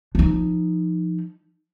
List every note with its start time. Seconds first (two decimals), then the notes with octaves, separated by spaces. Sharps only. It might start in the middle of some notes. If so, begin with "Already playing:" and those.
0.15 F3 D#4